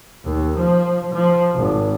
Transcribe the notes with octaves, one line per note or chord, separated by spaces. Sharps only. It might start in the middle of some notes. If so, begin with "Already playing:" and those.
D#2
F3
F3
G#1